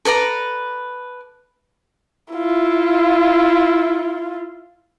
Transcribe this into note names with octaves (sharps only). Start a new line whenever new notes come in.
A4 B4 D5 A#5
E4 F4